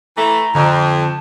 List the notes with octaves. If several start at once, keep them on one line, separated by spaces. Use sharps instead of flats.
E3 A3 A#5
F2 D3
A5